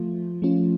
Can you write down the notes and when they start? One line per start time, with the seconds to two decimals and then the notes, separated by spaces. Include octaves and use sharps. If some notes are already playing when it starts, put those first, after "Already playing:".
Already playing: F3 A3 F4
0.42 F3 A3 C#4 F4